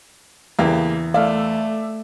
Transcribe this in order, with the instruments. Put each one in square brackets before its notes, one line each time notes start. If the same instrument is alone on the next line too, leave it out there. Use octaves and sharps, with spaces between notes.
[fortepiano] E2 [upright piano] C#3 A#3 G4
[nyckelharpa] A3 [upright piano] D5 E5 [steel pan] F5